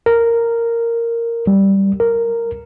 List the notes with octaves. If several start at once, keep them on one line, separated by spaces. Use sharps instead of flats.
A#4
G3
A#4